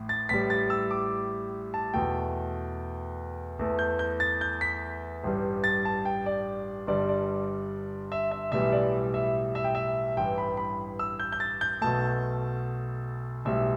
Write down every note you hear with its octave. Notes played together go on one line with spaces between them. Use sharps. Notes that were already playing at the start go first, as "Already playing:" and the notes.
Already playing: A1 A2
A6
A1 A2 G3 B6
A6
E6
D6
A5
E2 B2 A3 G5
E2 E3 A3
G6
G6
A6
G6
B6
A1 G2 G3
A6
A5
G5
D5
G1 G2 G3 D5
D5
E5
E5
B1 A2 E3 G3 E5
D5
E5
E5
G5
E5
A1 G2 E3 G5
B5
B5
E6
G6
G6
A6
G6
B1 B2 A3 A5
B1 A2 G3 E5